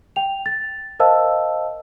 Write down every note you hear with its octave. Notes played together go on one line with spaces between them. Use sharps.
G5 F7
A6
A#4 C5 D#5 F5 A5 E6